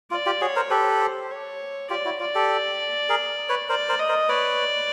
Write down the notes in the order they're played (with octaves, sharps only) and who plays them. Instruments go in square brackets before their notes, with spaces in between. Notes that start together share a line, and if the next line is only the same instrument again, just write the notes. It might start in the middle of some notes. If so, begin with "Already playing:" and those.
[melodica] F4 [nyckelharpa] D5
[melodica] F4 G4
[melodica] F#4 G#4 [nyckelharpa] C#5
[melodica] A#4 C5
[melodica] G4 A4 [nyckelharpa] B4
[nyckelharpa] C5
C#5
[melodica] F4 G4 [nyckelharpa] D5
[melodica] E4 F#4
[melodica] F4 [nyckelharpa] D5
[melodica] G4 A4
G#4 A#4
B4 C#5
[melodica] A#4 C5 [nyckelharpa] D5
[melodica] A#4 C5
[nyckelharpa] D#5
[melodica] A#4 C5
[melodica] B4 C#5 [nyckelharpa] D5